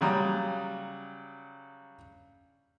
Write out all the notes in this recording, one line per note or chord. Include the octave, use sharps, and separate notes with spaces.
C#3 F#3 G3 A#5 D#6